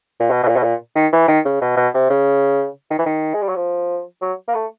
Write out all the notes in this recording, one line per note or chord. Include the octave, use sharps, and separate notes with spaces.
A#2
B2
B2
A#2
B2
A#2
D#3
E3
D#3
C#3
B2
B2
C3
C#3
D#3
E3
D#3
G#3
G3
F#3
F3
F#3
A#3
A3